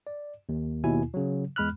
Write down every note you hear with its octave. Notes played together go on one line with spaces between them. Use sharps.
D5
D#2
D#2 B2 E4 G#5
C#3 F#3
E2 G#3 B5 F6 F#6